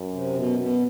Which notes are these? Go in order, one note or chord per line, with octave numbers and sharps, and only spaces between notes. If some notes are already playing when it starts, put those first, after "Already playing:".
Already playing: F#2
C3
B2
B2